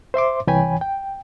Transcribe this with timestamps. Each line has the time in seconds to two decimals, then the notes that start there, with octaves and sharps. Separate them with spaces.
0.14 C5 E5 C6 D6
0.47 C2 E3 C#5 G5 G#5 B5
0.81 G5